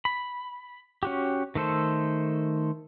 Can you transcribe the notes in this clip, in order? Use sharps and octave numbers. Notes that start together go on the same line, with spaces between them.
B5
C#4 F#4 G4
D#3 A3 A4 C5